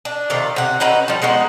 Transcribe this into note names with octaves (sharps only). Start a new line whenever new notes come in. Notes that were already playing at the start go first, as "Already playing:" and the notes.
D4
C3 D#3 F4 D5
C3 F#5
C#4 D#4 F#4 B4
F3 G3
G#3 B3 D#4 F#4